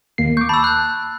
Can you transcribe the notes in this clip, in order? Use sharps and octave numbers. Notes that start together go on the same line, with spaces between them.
D#2 A#3 C7
C#6 D6 G6
A5 B5 E6
F#6 G6